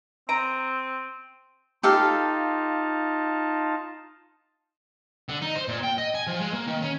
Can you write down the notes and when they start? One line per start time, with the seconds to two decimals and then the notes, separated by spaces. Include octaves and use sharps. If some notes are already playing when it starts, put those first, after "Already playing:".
0.29 C4 A#5 D7 D#7
1.83 D#4 F4 G4 A4 F5 A5
5.29 D3
5.42 D#4
5.55 C5
5.68 A#2
5.83 G5
5.98 D#5
6.15 G#5
6.27 F3
6.40 G#3
6.54 A#3
6.67 D#3
6.81 C#4